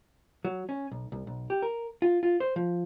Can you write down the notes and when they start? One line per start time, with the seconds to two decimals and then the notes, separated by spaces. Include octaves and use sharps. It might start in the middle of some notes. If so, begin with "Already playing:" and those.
0.45 F#3
0.69 C#4
0.92 B1
1.12 C2
1.27 B1
1.50 G4
1.62 A#4
2.02 F4
2.23 F4
2.40 C5
2.56 F3